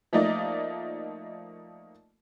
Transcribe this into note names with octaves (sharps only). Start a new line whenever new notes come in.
F3 A3 A#3 D#4 D5 D#5